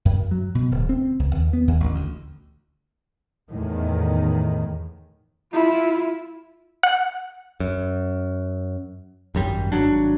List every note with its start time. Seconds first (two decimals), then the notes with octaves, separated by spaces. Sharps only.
0.05 F#2
0.31 F#3
0.55 B2
0.71 D1
0.89 C4
1.19 C#2
1.35 D#2
1.53 B3
1.68 D#2
1.80 A1
1.95 D2
3.51 E2 A2 D#3
5.53 E4 F4
6.83 F#5
7.60 F#2
9.35 G#1 F#2 G3
9.72 G#1 F#3 D4